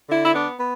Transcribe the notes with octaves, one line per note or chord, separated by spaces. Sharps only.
D3 E4
E4
B3 D4
B3